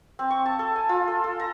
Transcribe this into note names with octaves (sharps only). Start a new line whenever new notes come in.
C4
C#6
A5
A4
G#5
F4
A4
A4
A#5